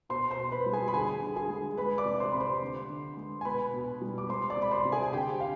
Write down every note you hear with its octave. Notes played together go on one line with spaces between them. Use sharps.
B2 C5 C6
C5 C6
B2
B4 B5
G3
G#4 G#5
B5
D3 G#4 G#5
D3
G#4 G#5
G#3
G#3 B4 B5
D5 D6
C3
C5 C6
C3 B5
C5 C6
D3
D3
G#3
G#5
B2 B4 B5
B2
G3
D6
G#3 C5 C6
D5 D6
C3
B5
C5 C6
C3
G#4 G#5
G#5
D3 G4 G5
F5